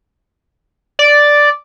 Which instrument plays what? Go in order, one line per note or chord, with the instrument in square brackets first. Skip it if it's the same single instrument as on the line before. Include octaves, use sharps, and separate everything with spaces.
[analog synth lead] D5